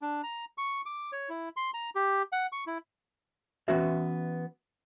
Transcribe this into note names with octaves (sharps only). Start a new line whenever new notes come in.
D4
A#5
C#6
D6
C#5
E4
C6
A#5
G4
F#5
C#6
E4
E3 B3 C#4 F#4 E5